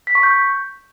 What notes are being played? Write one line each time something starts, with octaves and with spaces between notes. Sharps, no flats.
B6
C#6
G6